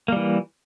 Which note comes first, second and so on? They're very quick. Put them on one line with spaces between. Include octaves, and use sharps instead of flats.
A#3 G3 E3